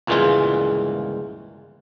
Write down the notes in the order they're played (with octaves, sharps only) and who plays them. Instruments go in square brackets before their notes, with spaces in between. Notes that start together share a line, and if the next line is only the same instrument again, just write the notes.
[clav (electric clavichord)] G1 C#2 A#2 E3 G#3 F4